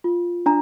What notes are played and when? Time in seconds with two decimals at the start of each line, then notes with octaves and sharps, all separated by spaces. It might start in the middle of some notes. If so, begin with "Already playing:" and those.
0.04 F4
0.46 D4 A#5